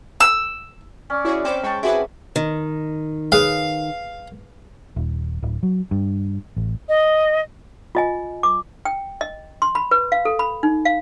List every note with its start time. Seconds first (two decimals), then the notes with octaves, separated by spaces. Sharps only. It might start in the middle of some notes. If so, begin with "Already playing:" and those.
0.20 E6
1.10 C#4 D5
1.25 E4 F#4 G#4 C#5
1.45 C4 B4 C5 D6
1.63 G#3 G5 A5 C#6
1.83 C4 E4 F#4 G#4 B4 G#5 D6
2.36 D#3
3.32 G#4 B4 C#5 F5
4.96 D#1
5.43 D1
5.63 F#3
5.91 G2
6.57 A1
6.89 D#5
7.95 F4 D#5 G#5
8.43 D6
8.85 G5
9.21 D#5
9.62 C6
9.75 B5
9.91 B4
10.12 F5
10.25 A4
10.39 B5
10.63 D#4
10.85 F5